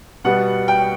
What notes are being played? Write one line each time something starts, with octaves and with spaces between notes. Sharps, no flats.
B2 G3 B3 F#5
G5